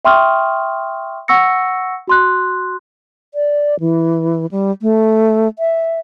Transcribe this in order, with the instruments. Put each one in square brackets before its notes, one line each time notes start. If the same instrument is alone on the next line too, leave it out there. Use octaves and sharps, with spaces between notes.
[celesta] E5 G5 C6 C#6 D#6 F6
F#5 C#6 E6 A#6 C#7
F#4 C6 F#6
[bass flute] D5
E3
G3
A3
E5